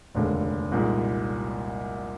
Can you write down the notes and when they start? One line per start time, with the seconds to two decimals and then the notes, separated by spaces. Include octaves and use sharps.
0.15 F1 D#2 D3 G#3
0.72 C2 A#2 G#3 D#4